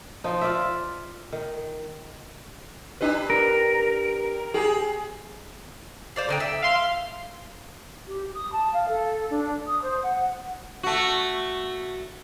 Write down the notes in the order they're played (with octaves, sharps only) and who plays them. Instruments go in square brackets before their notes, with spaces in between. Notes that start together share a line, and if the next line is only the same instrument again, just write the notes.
[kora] F3 D#4
F4 D5 E5
D#3
[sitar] D4 G4 B4
[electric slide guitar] A#4
[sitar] G4 G#4
[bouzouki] C5 D5 F5
D3 D#4 G5
E5
[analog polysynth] F5 C6
[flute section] G4
D#6
A5
F5
A4
D4
D#6
C5
F#5
[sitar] A3 F#4